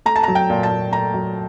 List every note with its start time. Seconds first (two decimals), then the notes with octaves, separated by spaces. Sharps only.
0.05 A3 A#5
0.16 A5
0.23 F#3 A#5
0.35 G5
0.50 A#2
0.63 A5
0.70 A#2
0.91 A3 A#5
1.14 F#3